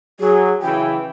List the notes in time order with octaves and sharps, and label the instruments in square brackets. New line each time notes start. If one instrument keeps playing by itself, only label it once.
[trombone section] F#3 [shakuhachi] G#4
[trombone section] C#3 E3 [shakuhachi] G5